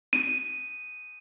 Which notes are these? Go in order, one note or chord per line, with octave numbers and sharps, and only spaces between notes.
D#7